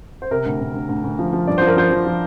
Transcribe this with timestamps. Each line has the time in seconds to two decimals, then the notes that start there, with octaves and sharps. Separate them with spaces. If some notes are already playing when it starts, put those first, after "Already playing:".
0.22 C5
0.31 C3 A#4
0.46 D2
0.60 D2
0.74 D2
0.89 D2
1.04 D2
1.19 F3
1.33 F3
1.48 G2 D5
1.58 F3 C5
1.67 A#4
1.77 F3 C5
1.91 F3
2.05 F3